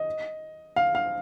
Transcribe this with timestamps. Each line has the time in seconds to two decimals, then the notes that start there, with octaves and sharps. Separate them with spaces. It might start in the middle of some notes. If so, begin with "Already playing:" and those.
Already playing: D#5
0.76 F5
0.95 F5